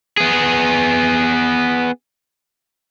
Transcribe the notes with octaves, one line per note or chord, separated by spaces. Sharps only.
B3 G#4